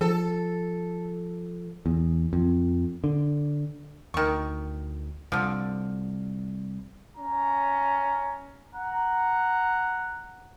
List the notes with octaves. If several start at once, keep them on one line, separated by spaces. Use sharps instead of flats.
F3 A4
E2
F2
D3
D2 D#3 C#6
C2 D3 F3
C#4 A#5
F#5 A#5